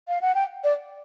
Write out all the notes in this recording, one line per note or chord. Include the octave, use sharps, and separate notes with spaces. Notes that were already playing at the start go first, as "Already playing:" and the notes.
F5
F#5
G5
D5